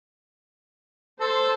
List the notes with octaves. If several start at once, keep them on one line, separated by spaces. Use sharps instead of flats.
A4 C5